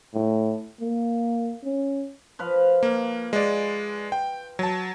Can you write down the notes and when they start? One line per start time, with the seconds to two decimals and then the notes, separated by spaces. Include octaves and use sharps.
0.14 A2
0.81 A#3
1.64 C#4
2.39 F3 B4 F5
2.83 A#3
3.33 G#3 D5
4.12 G5
4.59 F#3 A5